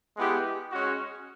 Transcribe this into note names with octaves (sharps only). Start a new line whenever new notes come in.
G#3 B3 E4 G4
G#3 C#4 F#4